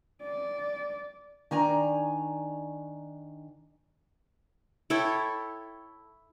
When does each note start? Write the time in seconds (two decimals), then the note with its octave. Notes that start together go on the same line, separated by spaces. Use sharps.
0.22 D5
1.51 D#3 D4 G#5 A#5
4.90 E4 A4 C#5 G5